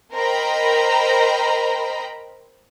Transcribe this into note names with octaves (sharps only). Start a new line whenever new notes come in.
A#4 C5 D#5 G5 A#5 B5